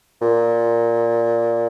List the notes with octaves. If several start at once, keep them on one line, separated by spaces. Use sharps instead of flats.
A#2